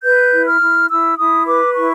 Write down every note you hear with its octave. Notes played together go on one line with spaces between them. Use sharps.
B4 G6
E4
F6
E4
E4 E6
E4 D#6
B4 D6
E4 C#6